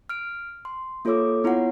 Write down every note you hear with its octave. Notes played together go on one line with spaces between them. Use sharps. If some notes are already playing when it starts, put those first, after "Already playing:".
F6 D7
C6
A#3 F4 A4 C#5 D6 E6
B3 E4 F4 C#5 F#5